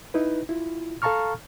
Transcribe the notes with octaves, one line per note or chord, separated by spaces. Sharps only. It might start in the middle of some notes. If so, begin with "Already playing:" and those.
D#4 E4 B4
E4 F4
A4 F5 A5 A#5 C#6 F6